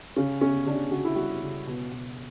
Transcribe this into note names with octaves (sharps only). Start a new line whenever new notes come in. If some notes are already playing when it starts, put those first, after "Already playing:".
C#3 C#4
C#3 C#4
C#3 D4
C#3 F#4
E4
G3 F#4
C#3
B2
B2